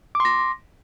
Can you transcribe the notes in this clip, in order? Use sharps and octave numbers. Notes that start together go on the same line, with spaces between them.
C6 D6 A#6